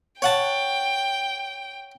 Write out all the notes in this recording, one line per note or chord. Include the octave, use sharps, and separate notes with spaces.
C#5 F#5 G5 A5